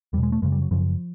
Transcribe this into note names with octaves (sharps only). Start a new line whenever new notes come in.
E2 B2 G3 G#3
A3
F#2 C#3 G#3
G3
F#3
F#2 C#3 F3